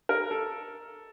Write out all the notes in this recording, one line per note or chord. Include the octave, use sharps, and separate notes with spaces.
A#4
A4